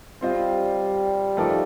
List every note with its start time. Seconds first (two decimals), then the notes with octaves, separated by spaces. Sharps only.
0.21 G3 C4 F4 C5 D#5
1.37 F3 A3 D#4 A#4 D5